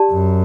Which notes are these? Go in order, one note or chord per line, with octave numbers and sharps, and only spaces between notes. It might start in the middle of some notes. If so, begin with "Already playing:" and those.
Already playing: G4 D5 A5
F#2